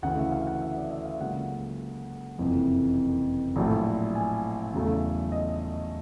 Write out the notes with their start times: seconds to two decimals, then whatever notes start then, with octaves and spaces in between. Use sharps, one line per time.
0.02 D2 C#3 E3 A3 F#5
0.18 E5
0.32 F5
0.47 F#5
0.61 E5
0.77 D5
0.91 E5
1.05 F5
1.20 C#2 C#3 F#3 A#3 F#5
2.39 F#1 F2 C3 E3
3.56 A#1 A2 F#3 A3
4.15 G#5
4.73 E2 C#3 F#3 A3
5.32 D#5